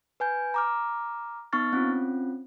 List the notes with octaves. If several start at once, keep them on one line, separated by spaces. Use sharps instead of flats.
B4 G#5 G6
A#5 D6 F6
B3 D#4 C#6 F6 A6
C4 C#4 F4